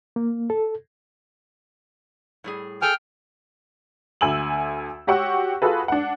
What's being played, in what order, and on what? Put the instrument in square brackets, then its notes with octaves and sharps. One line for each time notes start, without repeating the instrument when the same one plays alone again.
[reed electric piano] A#3
A4
[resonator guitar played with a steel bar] A2 G3 G#4
[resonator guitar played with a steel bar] G#4 A4 G#5 [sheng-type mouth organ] G5 F6
[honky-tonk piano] D2 G#5 E6 F#7
F#4 G4 C#5 F#5 C#6 E6
F4 F#4 G#4 A4 B4
D4 F#5